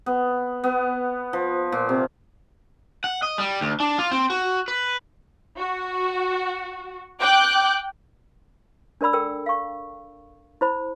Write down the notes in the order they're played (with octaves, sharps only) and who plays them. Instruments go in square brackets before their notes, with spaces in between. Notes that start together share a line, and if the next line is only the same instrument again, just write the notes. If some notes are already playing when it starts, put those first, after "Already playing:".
[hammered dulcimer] B3
B3
F3
A#2
C3
[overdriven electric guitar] F#5
D#5
G3
D2
D4
F4
C4
F#4
B4
[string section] F#4
G5 D6 F#6 G6
[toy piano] D4 A#4 D5 B5 E6
A4 A#4 G5 E6
F5 C#6
E4 C5 B5